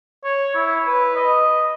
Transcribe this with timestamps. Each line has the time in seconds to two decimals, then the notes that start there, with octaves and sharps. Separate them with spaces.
0.24 C#5
0.55 E4
0.87 B4
1.16 D#5